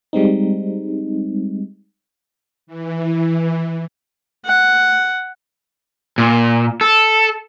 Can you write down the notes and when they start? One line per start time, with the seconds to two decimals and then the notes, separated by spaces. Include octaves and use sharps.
0.13 G3 G#3 C4 D#4
2.67 E3
4.46 F#5
6.18 A#2
6.81 A4